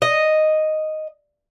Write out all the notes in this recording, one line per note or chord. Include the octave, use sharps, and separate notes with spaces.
D#5